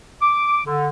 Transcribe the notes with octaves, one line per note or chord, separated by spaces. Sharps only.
D6
D3